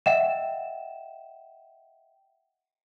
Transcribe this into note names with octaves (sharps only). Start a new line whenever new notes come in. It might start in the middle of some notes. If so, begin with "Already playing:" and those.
D#5 E5 F#5 G5 E7